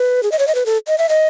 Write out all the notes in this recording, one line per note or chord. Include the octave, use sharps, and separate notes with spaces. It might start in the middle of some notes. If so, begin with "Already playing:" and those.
Already playing: B4
G#4
D#5
C#5
D#5
B4
A4
D#5
E5
D#5